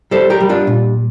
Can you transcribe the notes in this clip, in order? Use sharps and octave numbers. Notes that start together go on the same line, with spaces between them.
G3 A4 C5
G4 A#4
G3
D4 F4
A#2